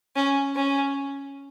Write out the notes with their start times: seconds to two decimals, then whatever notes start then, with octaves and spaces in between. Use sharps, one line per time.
0.16 C#4
0.55 C#4